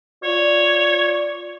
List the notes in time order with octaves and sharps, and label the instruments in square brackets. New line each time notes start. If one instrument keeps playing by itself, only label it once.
[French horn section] F4 D5 [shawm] C#5